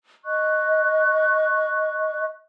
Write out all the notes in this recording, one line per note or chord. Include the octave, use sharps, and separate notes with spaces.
D#5 C#6 F#6